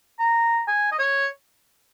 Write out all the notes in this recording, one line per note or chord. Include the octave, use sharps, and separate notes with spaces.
A#5
G#5
D#5
C#5